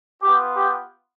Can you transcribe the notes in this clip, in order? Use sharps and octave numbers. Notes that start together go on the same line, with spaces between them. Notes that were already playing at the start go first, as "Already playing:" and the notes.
B3 F4 G4
G4